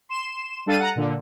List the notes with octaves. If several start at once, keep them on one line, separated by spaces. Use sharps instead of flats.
C6 E7
G3 D4 A4 F5 A6 D#7
F#5 A#5
A#2 D3